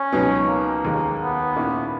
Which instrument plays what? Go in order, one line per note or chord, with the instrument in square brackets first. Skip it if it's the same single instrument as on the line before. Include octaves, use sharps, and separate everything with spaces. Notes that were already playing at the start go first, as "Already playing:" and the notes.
Already playing: [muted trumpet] C#4
[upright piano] C#2 B2 F#3 B3 D#4
[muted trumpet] A#3
[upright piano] D#2 D#3 G#3
[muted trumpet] B3
[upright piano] A#2 A#3 C#4 E4